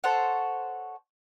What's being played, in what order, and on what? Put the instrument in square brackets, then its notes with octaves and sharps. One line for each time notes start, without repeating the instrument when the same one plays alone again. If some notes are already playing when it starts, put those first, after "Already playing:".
[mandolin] A4 C5 C#5 F#5